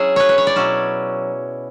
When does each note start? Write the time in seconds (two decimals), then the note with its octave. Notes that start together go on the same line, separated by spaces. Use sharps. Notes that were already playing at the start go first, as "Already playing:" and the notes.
Already playing: F#3 C#4 E4 G#4
0.16 B4 C#5
0.29 B4
0.38 C#5
0.47 D5
0.56 B2 F#3 C#4 E4